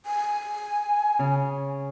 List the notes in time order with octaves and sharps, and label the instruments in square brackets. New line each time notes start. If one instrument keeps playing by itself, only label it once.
[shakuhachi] G#5
[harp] C#3